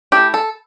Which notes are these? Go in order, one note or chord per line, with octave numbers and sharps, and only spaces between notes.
A3 E4 G4
A4